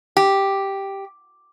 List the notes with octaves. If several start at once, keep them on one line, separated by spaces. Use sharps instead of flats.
G4